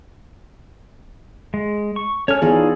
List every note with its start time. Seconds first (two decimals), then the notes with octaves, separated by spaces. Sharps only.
1.54 G#3
1.96 C#6
2.28 C#4 A4 C#5 F6
2.42 E3 B3 D#4 F4 G#4 D5